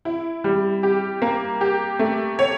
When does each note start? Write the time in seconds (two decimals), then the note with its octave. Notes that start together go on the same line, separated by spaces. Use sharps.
0.05 E4
0.44 G3
0.83 G4
1.22 A#3
1.61 G4
1.99 A3
2.39 C#5